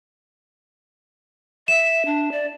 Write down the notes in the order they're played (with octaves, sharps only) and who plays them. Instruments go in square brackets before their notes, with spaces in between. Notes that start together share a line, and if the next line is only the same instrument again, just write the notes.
[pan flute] E5 [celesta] E7
[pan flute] D4
D5